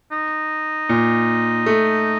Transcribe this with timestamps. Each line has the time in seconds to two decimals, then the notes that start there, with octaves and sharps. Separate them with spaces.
0.12 D#4
0.89 A#2
1.66 A3